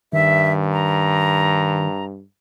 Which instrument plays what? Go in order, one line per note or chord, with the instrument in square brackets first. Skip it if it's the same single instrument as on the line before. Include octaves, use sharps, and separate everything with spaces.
[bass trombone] G2 [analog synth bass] D#3 [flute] E5
[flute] A#5